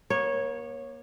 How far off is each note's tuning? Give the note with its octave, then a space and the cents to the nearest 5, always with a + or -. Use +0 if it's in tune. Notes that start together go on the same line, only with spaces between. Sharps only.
A#3 +35 C#5 -10